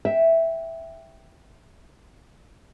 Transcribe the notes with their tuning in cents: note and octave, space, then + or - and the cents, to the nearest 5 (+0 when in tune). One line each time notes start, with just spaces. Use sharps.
E5 +0 G5 +0